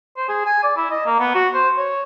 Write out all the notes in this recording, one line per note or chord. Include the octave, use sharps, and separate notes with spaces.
C5
G#4
G#5
D5
E4
D#5
A#3
B3
F#4
C5
C#5